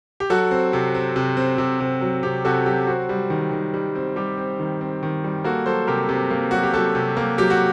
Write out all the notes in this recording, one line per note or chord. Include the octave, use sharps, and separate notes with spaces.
G4
F#3 F#4 A4
C4
C3
C4
C3
C4
C3
C3
F#3
C3 G4
C3 F#4 A4
F#3 G4
C4 F#4
G3
D#3
D#3
G3
C4
G3 G4
C4
D#3
C4
D#3
G3
A#3 F#4 A4
F#3 A4 C5
C3 G4 A#4
C3
A#3
F#3 F#4
G4
F#3 F#4 A4
C3
A#3
F#3 G4
F#4